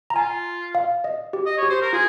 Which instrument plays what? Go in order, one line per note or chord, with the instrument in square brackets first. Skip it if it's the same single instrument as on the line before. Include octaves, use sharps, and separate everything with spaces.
[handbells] A#5
[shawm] F4 [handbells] G#5
[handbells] F5
D#5
G4
[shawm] D#5
C#5
[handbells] G4
[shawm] C5
A#4
[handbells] F4 [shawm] G#4